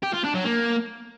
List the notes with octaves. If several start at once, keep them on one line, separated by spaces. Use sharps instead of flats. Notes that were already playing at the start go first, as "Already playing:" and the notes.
G4
F4
D4
F#3
A#3